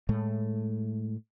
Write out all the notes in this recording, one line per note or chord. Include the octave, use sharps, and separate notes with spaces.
A2 G#3 A3